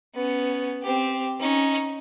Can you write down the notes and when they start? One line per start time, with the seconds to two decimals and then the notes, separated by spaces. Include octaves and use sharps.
0.14 B3 C#4
0.82 C4 G4
1.40 C#4 D#4